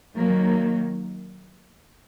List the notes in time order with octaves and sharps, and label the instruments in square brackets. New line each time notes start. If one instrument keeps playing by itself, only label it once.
[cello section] D#3 F#3 A#3